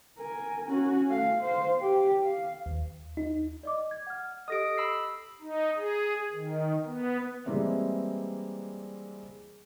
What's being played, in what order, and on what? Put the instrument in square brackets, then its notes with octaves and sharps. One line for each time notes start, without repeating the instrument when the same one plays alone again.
[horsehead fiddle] A#4 G#5
C#4 F#4
A3 F5
C5 F5
G4
F5
[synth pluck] D#2
D#4
[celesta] D5 D#5 D6
G#6
F#5 F6
[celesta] G4 A4 D#5 [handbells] D#6 A#6 D7
[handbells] B5 E6 C7
[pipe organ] D#4
G#4
D#3
B3
[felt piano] E3 G3 G#3 A#3 C4 E4